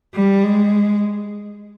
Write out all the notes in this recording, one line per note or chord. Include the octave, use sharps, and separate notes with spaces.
G3
G#3